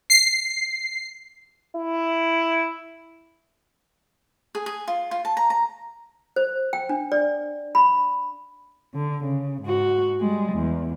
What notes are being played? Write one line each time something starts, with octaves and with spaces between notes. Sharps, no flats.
C7
E4
G#4
G#4
F4
F4
A5
A#5
A#5
C5
G5
D4
D5
B5
D3
C#3
G#2 F#4
G3 G#3
E2